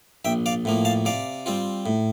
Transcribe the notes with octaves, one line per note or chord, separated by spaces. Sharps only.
A#1 E5 G5
D5 F5
A2 F3 A#3
F5 A5
C3 D5 F5
G3 C4 F4
A2